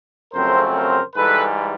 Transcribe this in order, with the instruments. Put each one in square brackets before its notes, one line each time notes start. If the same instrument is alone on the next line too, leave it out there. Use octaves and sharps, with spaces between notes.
[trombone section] F2 C#3 F#3 A3 C4 A#4 C5
A#4 C5
G#2 E3 G3 A4 B4